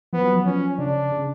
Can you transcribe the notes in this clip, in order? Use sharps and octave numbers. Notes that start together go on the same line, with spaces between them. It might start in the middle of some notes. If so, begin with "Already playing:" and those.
F3 B3
F#3
F3
F3 C#4
C#3 D4
C#3